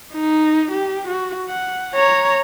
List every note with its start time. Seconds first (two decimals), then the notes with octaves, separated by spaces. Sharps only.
0.14 D#4
0.71 G4
1.07 F#4
1.49 F#5
1.95 C#5 A#5